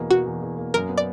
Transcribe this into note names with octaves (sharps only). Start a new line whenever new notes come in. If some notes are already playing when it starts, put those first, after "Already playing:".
Already playing: E2 B2 A#3
B2 F#4
E2
E2
A#3
F#2 A#4
B3
D5